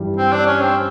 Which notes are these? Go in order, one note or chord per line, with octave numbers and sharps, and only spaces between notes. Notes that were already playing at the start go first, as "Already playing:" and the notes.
Already playing: G2 E3 G3
C4
D4
C#4
C4